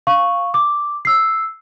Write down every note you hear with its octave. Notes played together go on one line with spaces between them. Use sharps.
F5 C#6
D6
E6 C7